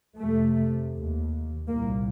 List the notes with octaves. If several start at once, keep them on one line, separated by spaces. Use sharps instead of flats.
F2 C3 A3
D#2
C2 A#2 A#3